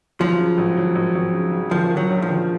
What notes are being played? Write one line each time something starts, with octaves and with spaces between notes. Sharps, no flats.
F3 F#3
C#3
G#1
F#3
G#1
G#1
C#3
C#3
D#3 F3
D#3
F#3
A#1
F3
D#3